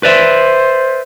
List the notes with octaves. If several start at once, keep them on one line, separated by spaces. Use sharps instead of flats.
B4 C5 D5 E5